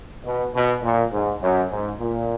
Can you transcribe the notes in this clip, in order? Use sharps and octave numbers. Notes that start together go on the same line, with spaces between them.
B2
B2
A#2
G#2
F#2
G#2
A#2